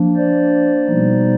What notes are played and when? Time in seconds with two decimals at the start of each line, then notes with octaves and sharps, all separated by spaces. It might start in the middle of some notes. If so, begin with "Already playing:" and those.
Already playing: F3 A#3 D4
0.16 C5 D5
0.87 B2 G3 B3 D#4